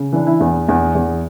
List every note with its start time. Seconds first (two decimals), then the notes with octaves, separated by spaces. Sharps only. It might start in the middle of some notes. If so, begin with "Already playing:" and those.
Already playing: C#3
0.13 E3 D4
0.27 E4
0.40 E2
0.68 E2
0.95 E2